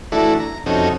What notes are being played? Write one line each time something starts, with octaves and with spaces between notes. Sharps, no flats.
E3 A3 D4 E4 F#4 A4
A#5
F2 C3 C#4 D#4 F#4 A4